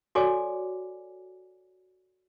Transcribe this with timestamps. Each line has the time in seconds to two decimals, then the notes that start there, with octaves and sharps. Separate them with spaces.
0.15 F#4 A4 C#5 D5 G#5 D6